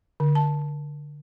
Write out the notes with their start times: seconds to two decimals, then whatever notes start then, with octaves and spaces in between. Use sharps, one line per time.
0.20 D3
0.35 A5